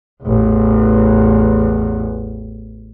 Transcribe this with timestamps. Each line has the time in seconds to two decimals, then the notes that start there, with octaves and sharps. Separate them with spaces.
0.23 A1 E2